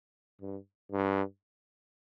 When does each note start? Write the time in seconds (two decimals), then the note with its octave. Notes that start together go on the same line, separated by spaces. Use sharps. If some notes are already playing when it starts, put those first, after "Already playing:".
0.41 G2
0.92 G2